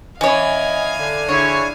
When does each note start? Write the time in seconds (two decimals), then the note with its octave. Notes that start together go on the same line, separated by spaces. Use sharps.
0.21 E3 C#4 C#5 D#5 F5 G#5
0.97 D3
1.29 D3 E4 G#4 C#5